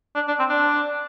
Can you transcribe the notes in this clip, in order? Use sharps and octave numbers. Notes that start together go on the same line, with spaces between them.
D4
D4
C4
D4